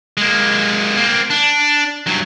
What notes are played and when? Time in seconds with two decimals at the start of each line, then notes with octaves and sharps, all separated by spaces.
0.17 G#3 A#3
0.97 A#3 C4
1.30 D4
2.06 G2 F#3